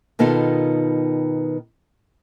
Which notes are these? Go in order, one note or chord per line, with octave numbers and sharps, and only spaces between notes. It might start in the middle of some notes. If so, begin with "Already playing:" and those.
B2 D#3 B3 D#4 F4 A4